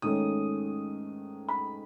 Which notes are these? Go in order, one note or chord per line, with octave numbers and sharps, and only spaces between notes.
G#2 D#3 A3 C#4 D#6
B5